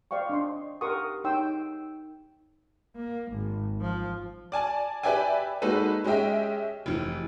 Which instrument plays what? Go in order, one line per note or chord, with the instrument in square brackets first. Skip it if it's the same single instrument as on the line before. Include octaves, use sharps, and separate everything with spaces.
[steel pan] C5 D5 F5 G5 C#6
D4 D#5 C6
G4 A#4 F#5 C6 C#6 D#6
D#4 C#5 G5 C6 E6
[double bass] A#3
G#1
F3
[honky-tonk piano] D5 G#5 A5
G4 B4 D5 E5 G5 G#5
G#3 A#3 D#4 F#4 A4 B4
G#3 C#4 G4 D#5 E5 G5
F1 E3